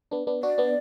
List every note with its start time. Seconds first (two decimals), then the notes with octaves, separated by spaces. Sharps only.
0.11 B3 D4
0.27 B3 D4
0.43 D4 F#4 D5
0.58 B3 D4